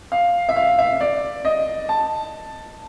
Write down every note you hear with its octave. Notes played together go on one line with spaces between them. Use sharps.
F5
E5
F5
E5
D5
D#5
A5